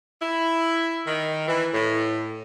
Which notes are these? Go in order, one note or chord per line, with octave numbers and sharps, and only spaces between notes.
E4
D#3
E3
A2